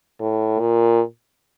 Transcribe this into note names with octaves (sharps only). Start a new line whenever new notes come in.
A2
A#2